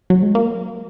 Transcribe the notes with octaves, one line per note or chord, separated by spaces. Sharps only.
F#3
G#3
A#3